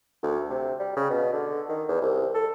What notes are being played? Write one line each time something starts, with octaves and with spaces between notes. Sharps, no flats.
D2
C3
G3
C#3
B2
D3
D#3
E2
C2
A4